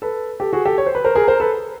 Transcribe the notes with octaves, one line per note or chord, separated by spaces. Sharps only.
A4 B4
G4 A4
F#4 G#4
G4 A4
C#5
C5
B4
A#4 C5
G#4 A#4
A#4 C5
A4 B4